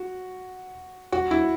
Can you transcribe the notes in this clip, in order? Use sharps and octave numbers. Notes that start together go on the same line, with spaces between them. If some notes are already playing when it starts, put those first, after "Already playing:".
Already playing: F#4
F#4
E4